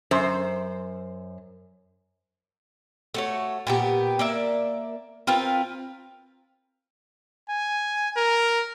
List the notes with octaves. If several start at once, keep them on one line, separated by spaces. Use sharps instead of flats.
F#2 C5
A3 F#4 C#5
A#2 B3 G4
A#3 D5 E5
C4 F4 A#4 B4
G#5
A#4